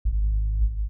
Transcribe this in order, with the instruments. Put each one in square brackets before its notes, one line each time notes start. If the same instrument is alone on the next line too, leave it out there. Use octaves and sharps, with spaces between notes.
[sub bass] G#1